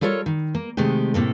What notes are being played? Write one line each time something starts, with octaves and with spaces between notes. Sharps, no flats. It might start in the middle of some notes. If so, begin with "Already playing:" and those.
G3 F4 A4 A#4 C#5
D#3
A#3
C3 D#3 G#3 A3 G4
A2 C3 A#3 A4